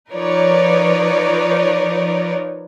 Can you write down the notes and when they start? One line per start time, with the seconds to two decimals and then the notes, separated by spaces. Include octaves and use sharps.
0.10 F3 D#4 A#4 B4 C#5 D5